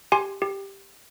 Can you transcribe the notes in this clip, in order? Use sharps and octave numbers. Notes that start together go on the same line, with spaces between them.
G4 G#5 C6
G4